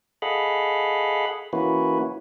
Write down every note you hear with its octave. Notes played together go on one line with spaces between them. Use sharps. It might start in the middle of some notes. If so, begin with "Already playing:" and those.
G#4 A4 D#5 F5 F#5 B5
E3 A#3 C#4 E4 F#4 B4